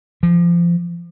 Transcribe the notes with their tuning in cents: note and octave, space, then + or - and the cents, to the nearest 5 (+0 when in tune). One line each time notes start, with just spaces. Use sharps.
F3 -25